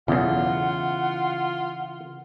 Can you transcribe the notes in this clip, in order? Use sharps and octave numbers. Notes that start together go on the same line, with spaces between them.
B1 E2 C#3 E3 F4 F#5